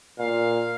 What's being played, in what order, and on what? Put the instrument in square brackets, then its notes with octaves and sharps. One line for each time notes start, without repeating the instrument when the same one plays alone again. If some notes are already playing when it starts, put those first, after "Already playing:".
[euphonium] A#2 [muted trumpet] F5